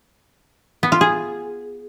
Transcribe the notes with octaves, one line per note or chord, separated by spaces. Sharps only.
B3
F4
G#4